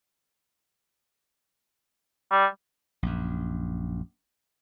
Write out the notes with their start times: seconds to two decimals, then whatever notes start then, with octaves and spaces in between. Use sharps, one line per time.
2.31 G3
3.03 A#1 F#2